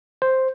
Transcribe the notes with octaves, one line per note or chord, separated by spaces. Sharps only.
C5